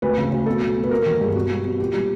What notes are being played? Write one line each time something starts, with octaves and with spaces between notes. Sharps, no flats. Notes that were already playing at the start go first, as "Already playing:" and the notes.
D2 B4
C#3
D2
B2 A4
F#3
B2
B4
A#3 A#4
A#4
D#3
A#4
G2 G#4
B2 F#4
G3
B2
A#2 G4
G3